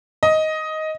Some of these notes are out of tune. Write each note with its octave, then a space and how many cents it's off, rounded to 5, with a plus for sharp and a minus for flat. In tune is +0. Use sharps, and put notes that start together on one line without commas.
D#5 +10